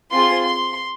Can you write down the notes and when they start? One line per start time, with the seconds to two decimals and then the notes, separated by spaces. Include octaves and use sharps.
0.12 C4 F4 G#4 C6
0.44 C6